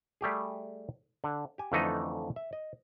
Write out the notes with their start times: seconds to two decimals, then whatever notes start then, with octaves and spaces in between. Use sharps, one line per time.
0.21 G3 A3 G4 G#4
1.24 D3
1.58 G4 G#5
1.72 F2 D3 E3 A3 D#4 D#5
2.36 E5
2.53 D#5